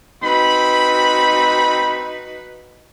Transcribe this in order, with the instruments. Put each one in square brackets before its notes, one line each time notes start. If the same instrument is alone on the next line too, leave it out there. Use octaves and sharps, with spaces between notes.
[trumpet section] C4 B5 [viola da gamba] D#4 F#4 B4